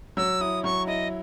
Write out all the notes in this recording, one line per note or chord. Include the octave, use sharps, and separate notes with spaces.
F#3 E6
E4 D#6
F#3 C#6
E4 D#5